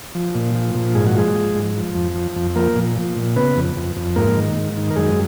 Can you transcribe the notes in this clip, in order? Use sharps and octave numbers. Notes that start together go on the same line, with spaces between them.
F3
A#2
F3
A#2
G#2 G#4
F#4
F3 G#3 G#4
F3
G#2
F3
F2
F3
F2
F3 A#3 A#4
A#2
F3
A#2
C#3 B3 B4
F2
F2
F2
G#2 A#3 A#4
D#3
G#2
D#3
A#4
F#2 G#3 G#4